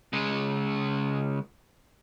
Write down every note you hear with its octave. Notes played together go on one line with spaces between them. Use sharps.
C#3 G#3